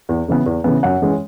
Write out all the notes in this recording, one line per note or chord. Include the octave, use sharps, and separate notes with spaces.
E2
C#3 E3 B3
E2
C#3 E3 B3
F#2 F#5
E3 G#3 C#4